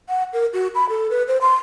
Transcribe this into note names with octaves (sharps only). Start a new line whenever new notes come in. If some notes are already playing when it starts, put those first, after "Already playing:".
F#5
A#4
F#4
B5
A4
B4
C5
C6